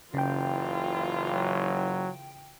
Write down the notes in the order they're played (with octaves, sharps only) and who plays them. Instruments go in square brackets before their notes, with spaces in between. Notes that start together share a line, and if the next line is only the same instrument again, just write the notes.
[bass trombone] F#1 [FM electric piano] C#3 G5 [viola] E3 F4
[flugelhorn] F#3